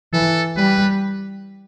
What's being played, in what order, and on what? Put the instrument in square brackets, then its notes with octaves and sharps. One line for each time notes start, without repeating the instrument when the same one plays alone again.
[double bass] E3 [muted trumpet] A4
[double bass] G3 [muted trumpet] B4